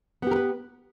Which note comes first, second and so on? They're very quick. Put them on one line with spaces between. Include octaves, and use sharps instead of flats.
B3 G4 A#4 B4